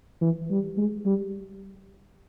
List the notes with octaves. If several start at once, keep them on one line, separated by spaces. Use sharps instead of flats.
E3
G3
G#3
G3